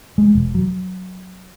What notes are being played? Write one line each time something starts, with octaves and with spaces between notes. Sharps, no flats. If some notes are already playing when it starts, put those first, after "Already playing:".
G#3
E1
F#3